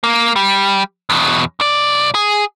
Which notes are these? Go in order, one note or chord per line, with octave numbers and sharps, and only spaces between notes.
A#3
G3
E2 B2
B1 D5
G#4